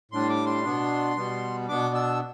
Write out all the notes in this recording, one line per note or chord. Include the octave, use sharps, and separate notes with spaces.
A2 G3 D4 C6
D6
C6
B2 B3 D4
B2 G3 B3
B2 B3 D4 D6
E6